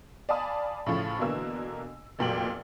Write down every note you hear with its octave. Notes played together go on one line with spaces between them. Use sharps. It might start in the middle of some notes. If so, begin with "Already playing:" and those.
D5 F5 G#5 A5 B5 D#6
A2 C#3 F3 C#4
B2 D3 E3 A#3 E6
F1 E2 A#2 F#3 G5 F#7